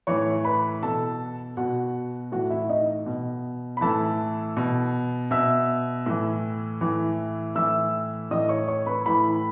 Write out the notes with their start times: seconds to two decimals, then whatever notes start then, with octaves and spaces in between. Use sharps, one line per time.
0.07 A2 E3 C#5 C#6
0.44 B4 B5
0.82 B2 A4 A5
1.57 B2 F#4 F#5
2.32 A2 E3 F#4 F#5
2.50 E4 E5
2.69 D#4 D#5
3.06 B2
3.77 B5
3.81 A2 E3 A4 A5
4.57 B2
5.31 B2 E5 E6
6.06 A2 E3
6.81 A2 E3
7.55 A2 E3 E5 E6
8.31 A2 E3 D#5 D#6
8.49 C#5 C#6
8.68 C#5 C#6
8.86 B4 B5
9.05 A2 E3 B4 B5